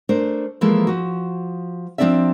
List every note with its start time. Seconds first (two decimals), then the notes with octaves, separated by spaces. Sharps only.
0.09 A3 D4 A#4 C5
0.61 E3 F3 G#3 A#3 A4
0.87 F3 F#4
1.98 F3 A#3 C4 D4 D5 E5